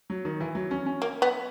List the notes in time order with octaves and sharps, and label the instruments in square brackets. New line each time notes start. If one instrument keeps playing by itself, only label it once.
[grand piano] F#3
D#3
E3
F#3
C#4
C#4
[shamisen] A#3
B3